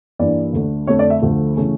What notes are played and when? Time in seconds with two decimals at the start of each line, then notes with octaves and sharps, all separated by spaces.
0.19 G2 E3 G3 A#3 D5
0.53 D2 D3 A3 D4
0.87 F2 D3 A3 C#5
0.99 D5
1.10 E5
1.22 D2 D3 F3 A3
1.56 C#3 E3 A3 C#4